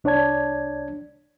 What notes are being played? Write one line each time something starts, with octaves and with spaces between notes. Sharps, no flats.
C2 D4 C#5 D5 A5 G#6